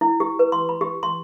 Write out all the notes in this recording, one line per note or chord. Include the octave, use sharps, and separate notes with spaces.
E4
G4
B4
C6
B5
G4
C6